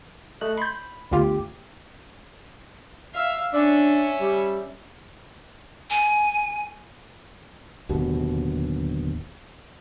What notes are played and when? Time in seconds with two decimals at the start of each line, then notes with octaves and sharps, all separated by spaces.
0.41 A3 D#5 F#6
0.57 B5 C6 G6
1.11 G1 D2 F4 G4
3.14 E5 F5
3.53 C#4 D4 E5
4.20 G3
5.90 G#5
7.89 D1 D#2 B2